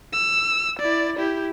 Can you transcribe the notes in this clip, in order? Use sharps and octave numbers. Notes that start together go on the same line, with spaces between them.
E6
E4 D5
E4 G4